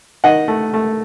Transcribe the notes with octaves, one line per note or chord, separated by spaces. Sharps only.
D#3 D#5 F#5
A3
A3